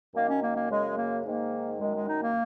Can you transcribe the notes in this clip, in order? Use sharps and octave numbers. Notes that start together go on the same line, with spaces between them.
F#2 D#3 A#3
C#4
A#3
A#3
F#2 C#3 G#3
A#3
G#2 D#3 A#3
F#2 D#3 G#3
G#3
D#4
A#3